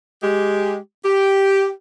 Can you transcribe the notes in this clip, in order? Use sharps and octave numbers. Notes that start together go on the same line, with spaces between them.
G#3 G4
G4